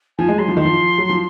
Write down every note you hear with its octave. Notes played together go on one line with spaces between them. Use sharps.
F3 G#5
G#3
F#3 C6
F3
D#3 C6
F3
F#3
F3